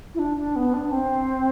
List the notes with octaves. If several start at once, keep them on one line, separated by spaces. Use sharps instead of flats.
E4
D4
D4
B3
D4
C4